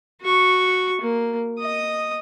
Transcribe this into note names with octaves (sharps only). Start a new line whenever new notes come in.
F#4 C#6
A#3
D#5 D#6